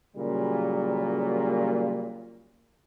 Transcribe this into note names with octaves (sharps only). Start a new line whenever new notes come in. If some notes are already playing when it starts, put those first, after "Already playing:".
A#2 C#3 F#3 G3 A#3